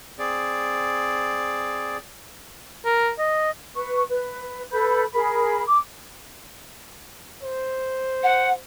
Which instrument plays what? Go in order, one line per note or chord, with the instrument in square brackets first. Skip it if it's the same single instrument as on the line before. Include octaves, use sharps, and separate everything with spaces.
[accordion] C4 G#4 D5
[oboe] A#4
D#5
[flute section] B4 C#6
B4
A4 B4 B5 G6
G#4 A#4 B5
D6
[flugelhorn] C5
[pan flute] F#5